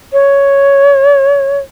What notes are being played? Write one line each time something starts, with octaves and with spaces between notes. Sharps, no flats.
C#5